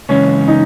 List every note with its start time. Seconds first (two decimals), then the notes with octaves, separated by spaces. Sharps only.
0.09 C#3 E3 G#3 C#4
0.48 D#4